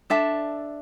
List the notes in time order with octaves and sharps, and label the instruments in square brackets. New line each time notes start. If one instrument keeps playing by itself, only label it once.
[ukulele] D4 A4 E5 A5